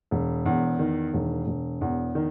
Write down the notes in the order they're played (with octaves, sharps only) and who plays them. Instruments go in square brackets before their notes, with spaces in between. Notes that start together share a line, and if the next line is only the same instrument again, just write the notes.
[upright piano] E1
E2
D#3
E1
E1
E2
D#3